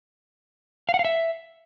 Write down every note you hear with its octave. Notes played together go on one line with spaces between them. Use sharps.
F5
F#5
F5
E5